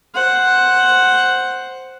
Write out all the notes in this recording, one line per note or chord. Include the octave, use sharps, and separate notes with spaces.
C5 F#5